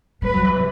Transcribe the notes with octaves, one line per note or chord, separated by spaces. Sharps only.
G3 B4
F#3
E3
C3